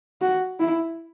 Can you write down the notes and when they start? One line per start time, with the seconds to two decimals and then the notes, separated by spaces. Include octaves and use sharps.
0.21 F#4
0.60 E4